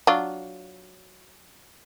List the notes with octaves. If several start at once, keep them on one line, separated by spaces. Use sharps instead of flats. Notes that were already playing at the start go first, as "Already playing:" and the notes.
F#3 D4 F4